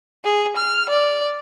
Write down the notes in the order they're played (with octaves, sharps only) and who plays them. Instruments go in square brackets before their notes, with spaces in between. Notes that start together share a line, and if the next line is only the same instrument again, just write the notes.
[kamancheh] G#4
F6
D5